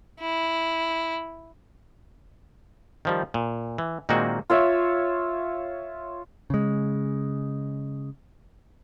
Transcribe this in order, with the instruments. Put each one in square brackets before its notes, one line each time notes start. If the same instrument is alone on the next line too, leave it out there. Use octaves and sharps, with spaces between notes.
[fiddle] E4
[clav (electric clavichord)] D#3 F3 G3
A#2
E3
A#2 D#3 G#3 A#3 C4 F#4
[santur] F4 C#5 E5
[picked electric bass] C#3 G#3